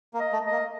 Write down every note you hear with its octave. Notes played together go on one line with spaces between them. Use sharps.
A#3
D#5
A3
D#5
A#3